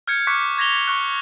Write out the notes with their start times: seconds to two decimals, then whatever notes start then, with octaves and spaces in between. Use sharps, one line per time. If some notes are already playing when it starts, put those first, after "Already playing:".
0.08 F6 G6 G#6 C#7
0.27 C#6 D6 F#6 G6 B6 C#7
0.57 C#6 G#6 A#6 B6 F7 G7
0.88 C#6 F6 F#6